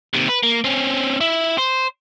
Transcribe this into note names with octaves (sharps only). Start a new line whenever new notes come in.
D#2 C3
B4
A#3
C4 C#4
E4
C5